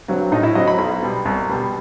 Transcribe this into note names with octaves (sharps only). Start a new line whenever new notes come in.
G2 F#3 C4
A2 D#4
E4
F#3 C4 D#5
B5
B1 B5
B2 G3
C2
B2 G3